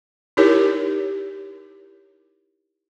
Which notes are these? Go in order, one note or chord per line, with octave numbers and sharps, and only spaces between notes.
D#4 E4 G4 A#4 C#5